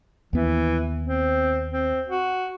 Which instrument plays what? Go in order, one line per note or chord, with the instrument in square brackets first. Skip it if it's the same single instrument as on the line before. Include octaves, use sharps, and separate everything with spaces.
[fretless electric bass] D#2 B3 [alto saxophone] E3
[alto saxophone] C4
C4
F#4